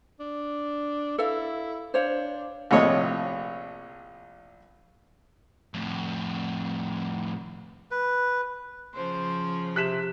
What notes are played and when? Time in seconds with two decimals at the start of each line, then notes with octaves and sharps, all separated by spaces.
0.20 D4
1.18 E4 A4 F5
1.94 D4 C5 C#5 F5
2.71 A#1 A2 C3 C#5 D#5
5.74 F2 A2
7.91 B4
8.94 C#3 F3 C5
9.76 C3 F#6 B6 E7